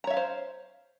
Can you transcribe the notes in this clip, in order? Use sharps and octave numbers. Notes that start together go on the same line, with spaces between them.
C5 C#5 E5 F5 A#5